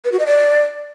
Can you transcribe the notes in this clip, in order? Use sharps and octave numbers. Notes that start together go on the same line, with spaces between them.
B4
F#4
D#5
D5